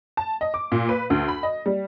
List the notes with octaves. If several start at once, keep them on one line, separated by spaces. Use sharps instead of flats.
A5
D#5
D6
A#2
B4
D2
B5
D#5
G3